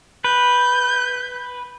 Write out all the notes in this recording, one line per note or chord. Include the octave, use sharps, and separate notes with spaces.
B4 G6